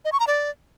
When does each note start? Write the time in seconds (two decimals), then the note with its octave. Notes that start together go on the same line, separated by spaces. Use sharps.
0.05 D#5
0.12 C#6
0.20 A#5
0.27 D5